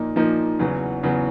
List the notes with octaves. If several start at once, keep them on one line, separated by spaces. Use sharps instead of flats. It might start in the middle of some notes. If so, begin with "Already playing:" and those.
Already playing: A#2 F3 A#3 D#4
A#2 F3 A#3 D#4
E2 C#3 F#3 B3
E2 C#3 F#3 B3